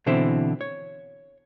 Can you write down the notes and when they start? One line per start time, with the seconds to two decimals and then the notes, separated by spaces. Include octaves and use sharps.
0.06 B2 D3 E3 C4 E4
0.61 C#5